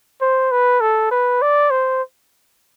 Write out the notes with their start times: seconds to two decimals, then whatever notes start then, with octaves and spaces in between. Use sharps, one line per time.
0.21 C5
0.51 B4
0.81 A4
1.11 B4
1.42 D5
1.71 C5